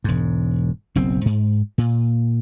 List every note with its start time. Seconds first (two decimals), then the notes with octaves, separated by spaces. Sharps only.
0.04 E1 G#2
0.95 F#1 B1 C4
1.25 G#2
1.78 A#2